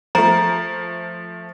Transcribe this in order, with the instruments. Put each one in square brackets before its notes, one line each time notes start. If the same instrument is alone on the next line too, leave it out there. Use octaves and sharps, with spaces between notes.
[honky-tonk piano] F3 A3 [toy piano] A#5